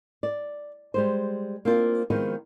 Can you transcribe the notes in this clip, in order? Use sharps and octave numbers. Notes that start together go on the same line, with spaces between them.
D5
G3 G#3 C5
A#3 C4 D4 F4
D#3 F3 G#3 B3 C4 F#4